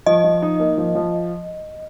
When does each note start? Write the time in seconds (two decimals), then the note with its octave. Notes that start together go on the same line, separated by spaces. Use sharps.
0.06 F3 D#5
0.24 F3
0.42 D#4
0.60 A#3
0.78 F3
0.95 F3